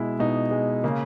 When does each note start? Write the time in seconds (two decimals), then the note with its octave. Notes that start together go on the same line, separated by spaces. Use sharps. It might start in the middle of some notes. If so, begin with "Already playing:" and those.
Already playing: B2 G#3 E4
0.19 B2 D#4
0.51 G#3
0.84 C#3 A#3